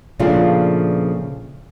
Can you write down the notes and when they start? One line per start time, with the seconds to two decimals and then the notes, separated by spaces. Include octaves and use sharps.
0.20 A#2 C#3 F3 A3 D4 F4